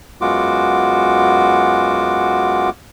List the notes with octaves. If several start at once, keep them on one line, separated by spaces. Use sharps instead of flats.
F#2 G#3 B3 F4 F#4 D6